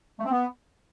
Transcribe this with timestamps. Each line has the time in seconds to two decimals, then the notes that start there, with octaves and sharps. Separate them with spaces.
0.19 A3
0.25 C4
0.31 B3